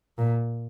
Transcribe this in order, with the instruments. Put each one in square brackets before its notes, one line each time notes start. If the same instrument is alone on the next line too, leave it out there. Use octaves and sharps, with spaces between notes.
[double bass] A#2